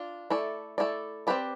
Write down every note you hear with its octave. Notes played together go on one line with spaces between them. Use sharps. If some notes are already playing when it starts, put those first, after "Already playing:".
Already playing: D4 F4
A3 E4 A4 D5
A3 E4 A4 D5
C4 G4 B4 D5